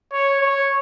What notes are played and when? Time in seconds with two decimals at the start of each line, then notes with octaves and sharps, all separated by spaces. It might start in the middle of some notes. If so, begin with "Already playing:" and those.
0.12 C#5
0.41 C#5